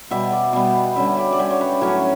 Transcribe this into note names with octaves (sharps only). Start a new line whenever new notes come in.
B2 G3 B3 E5
D5
B2 G3 B3
D3 G3 C#4 E5
D5
D5
D3 G3 C#4 E5
C#5
B4
D5
A2 F#3 C#4 C#5